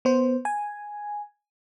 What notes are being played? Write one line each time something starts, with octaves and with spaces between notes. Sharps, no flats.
B3 C5
G#5